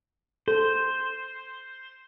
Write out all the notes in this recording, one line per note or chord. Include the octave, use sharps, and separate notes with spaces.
A4 C5